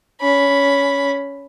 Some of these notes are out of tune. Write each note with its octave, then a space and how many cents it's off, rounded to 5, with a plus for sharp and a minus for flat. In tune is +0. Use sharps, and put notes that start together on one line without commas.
C#4 +15 B5 +0